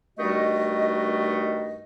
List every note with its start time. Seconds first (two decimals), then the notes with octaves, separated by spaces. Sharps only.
0.18 G2 D#3 G3 A3 F#4 D#5